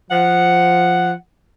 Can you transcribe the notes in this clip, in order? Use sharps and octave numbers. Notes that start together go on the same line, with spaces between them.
F3 F#5